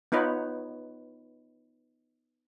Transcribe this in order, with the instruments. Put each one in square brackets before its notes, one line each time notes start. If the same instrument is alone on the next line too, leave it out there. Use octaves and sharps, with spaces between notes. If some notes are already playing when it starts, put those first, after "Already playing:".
[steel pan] B3 D#4 F4 B4 C#5